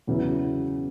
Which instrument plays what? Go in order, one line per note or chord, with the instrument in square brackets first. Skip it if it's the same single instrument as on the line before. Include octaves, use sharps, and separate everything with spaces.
[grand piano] E2 C#3 F#3 B3 E4